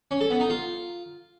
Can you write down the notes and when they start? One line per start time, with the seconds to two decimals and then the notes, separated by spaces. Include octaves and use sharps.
0.11 C#4
0.21 A4
0.30 B3
0.40 D#4
0.50 F4